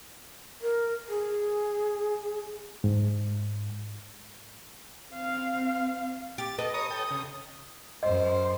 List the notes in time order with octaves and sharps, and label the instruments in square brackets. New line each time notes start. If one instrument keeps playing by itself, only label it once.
[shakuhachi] A#4
G#4
[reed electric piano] G#2
[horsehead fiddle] C4 F5
[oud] G4 [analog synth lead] A6
[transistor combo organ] A4 [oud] B4 [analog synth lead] D#5
[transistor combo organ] C#5 A#5 [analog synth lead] D#6
[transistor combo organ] A4 G5
C#3
[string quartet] F#2 C5 [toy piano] D#5